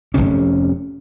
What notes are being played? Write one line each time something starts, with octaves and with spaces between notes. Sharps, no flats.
F1 B1 C3 C#4